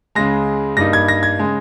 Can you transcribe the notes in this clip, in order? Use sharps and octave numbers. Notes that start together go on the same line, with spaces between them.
C#2 C#3 G#3 A#6
G2 G3 A#3 D#4 A#6
G#6
A#6
G#6
C#3 G#3